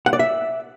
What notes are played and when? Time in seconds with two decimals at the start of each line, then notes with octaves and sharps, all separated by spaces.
0.06 F#5
0.13 D5
0.19 E5